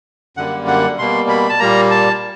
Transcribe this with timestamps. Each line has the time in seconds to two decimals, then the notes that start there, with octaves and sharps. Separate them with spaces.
0.37 F#2 D3 G3 A#3 F#5
0.67 F#5
0.98 B2 G3 A#3 C6
1.29 B5
1.49 A5
1.60 A#2 G3 A#3 A#5
1.91 A5